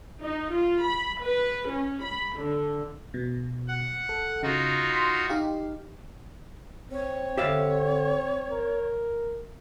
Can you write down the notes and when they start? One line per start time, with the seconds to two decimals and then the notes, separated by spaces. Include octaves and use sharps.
0.21 D#4
0.51 F4
0.83 B5
1.19 B4
1.69 C#4
2.01 B5
2.37 D3
3.14 B2
3.68 F#5
4.09 A4
4.43 C#3 D#4 F4 F#4
4.90 C6 B6
5.29 D#4 G4 F5
6.91 C4 C#5
7.37 D3 G4 E5 F5
8.50 A#4